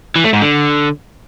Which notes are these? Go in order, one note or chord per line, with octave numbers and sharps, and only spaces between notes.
E3
A3
G#2
D3